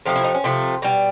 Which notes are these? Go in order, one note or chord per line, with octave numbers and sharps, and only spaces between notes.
C3 F3 A3 D4
E4
D#4
C#4
C3 F3 A3
B2 G3